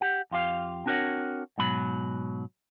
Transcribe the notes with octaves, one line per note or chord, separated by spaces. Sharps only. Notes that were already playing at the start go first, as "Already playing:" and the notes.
G4 F#5
F2 F4 G4 F5
C4 D4 F#4 A#4 C#5 F#5
G#2 B2 F#3 B5